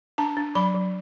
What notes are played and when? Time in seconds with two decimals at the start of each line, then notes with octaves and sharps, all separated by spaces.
0.18 D4 A5
0.37 D4
0.55 F#3 B5
0.74 F#3